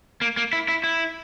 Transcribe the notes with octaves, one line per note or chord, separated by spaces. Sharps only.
A#3
A#3
E4
E4
E4